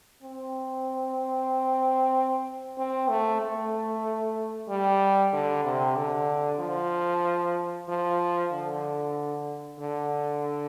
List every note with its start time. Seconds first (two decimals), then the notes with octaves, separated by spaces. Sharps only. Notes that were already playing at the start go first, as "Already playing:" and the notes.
0.22 C4
2.78 C4
3.09 A3
3.41 A3
4.69 G3
5.33 D3
5.65 C3
5.96 D3
6.60 F3
7.88 F3
8.52 D3
9.79 D3